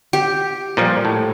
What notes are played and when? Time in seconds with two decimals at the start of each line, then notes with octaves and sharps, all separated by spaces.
0.13 G4
0.77 A#2 F3 G3
1.05 A2